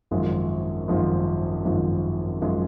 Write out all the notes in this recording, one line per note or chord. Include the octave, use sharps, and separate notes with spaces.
G#1 F#2 F3 G#3
G#1 F#2 F3 G#3
G#1 F#2 F3 G#3
F#2 F3 G#3